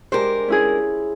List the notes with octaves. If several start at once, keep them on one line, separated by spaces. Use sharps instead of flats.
G#3 D4 G4 A#4 C5
C#4 E4 G#4